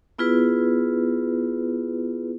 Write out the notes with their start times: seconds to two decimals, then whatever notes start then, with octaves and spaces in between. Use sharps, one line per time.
0.18 B3 E4 F4 G#4 B4